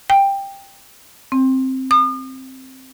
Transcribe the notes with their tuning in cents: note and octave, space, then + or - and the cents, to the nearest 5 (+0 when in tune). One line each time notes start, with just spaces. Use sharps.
G5 +10
C4 +5
D#6 -40